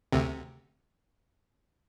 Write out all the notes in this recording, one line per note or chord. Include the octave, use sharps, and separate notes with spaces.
D2 C3